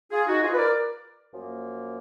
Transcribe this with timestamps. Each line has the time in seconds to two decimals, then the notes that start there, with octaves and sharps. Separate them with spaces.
0.11 F4 G#4
0.26 D#4 F#4
0.41 F4 G#4
0.52 B4
0.56 A#4 D5
1.31 F#2 F3 A#3